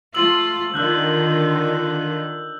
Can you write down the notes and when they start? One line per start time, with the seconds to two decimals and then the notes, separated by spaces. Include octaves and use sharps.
0.14 A3 F4 E6 F#7
0.74 D3 D#3 F4 E6 F#6 G6